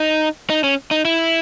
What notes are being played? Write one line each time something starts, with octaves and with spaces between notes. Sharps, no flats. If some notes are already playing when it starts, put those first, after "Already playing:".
Already playing: D#4
D#4
C#4
D#4
E4